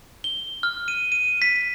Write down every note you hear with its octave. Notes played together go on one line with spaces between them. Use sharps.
G7
F6
D#7
D#7
B6